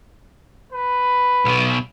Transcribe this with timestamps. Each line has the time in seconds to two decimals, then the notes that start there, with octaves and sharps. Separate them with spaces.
0.73 B4
1.45 B1 B2